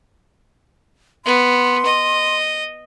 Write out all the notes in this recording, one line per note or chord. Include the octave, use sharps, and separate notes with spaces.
B3 C6
D#5